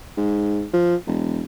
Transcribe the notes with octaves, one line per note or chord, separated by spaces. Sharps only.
G#2
F3
E1